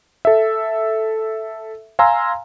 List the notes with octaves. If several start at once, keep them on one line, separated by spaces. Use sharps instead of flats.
A4 E5
F5 G#5 A#5 C6 E6